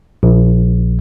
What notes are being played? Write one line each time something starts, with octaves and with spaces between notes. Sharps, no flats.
A#1